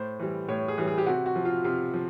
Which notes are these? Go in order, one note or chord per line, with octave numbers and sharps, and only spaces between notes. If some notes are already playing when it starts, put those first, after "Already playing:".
Already playing: A2 C5
E3 G3
A2 C#5
G#4
E3 G3
G#4
G4
C3 F#4
F#4
F3
F4
C3 F4
F3